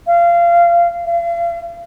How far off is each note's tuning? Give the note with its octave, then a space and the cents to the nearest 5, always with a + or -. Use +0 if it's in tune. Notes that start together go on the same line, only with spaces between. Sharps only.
F5 -25
F5 -40